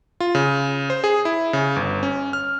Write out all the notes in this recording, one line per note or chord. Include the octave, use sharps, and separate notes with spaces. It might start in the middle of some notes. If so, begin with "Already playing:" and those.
F4
C#3
C5
G#4
E4
C#3
G1
C#4
F6